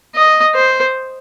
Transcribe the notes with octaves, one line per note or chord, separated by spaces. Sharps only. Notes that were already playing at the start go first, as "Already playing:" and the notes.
D#5
C5